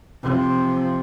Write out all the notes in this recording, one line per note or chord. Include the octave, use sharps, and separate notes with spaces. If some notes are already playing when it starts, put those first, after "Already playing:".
C3 F3